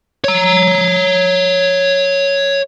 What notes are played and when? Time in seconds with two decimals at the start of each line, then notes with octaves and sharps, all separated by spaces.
0.24 C#5 A#5